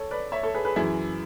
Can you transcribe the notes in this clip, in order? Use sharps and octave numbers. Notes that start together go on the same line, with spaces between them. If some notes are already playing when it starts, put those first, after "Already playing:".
Already playing: A4 C#5
B4 D5
C#5 E5
A4 C#5
G#4 B4
G#4 B4
F#2 E3 E4 G#4